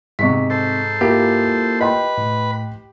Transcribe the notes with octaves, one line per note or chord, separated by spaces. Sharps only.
G#2 C3 D#5 C#6 B6
A4 C5
A#3 E4 F4 G4
B4 D#5 G5 B5 C6
A2